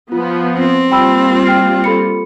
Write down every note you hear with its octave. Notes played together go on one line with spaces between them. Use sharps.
F3 B3 F4
C4
G3 A#3 F4 G5 B5 E6
G5 F6 C7
A4 B5 C#7